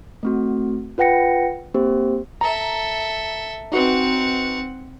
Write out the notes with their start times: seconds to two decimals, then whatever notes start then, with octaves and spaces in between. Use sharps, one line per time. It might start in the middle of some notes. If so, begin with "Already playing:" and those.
0.23 A3 C4 F#4
0.98 F4 B4 F#5 G5 A#6 C#7
1.74 A#3 C4 G4 C5
2.41 A4 E5 A#5
3.72 C4 D#4 F#4 B4 F#5